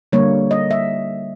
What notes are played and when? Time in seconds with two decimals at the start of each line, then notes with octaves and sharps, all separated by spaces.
0.12 D3 G3 A#3 C#5
0.51 D#5
0.71 E5